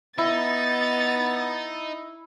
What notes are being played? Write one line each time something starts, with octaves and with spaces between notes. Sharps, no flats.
B3 D#4 E4 A6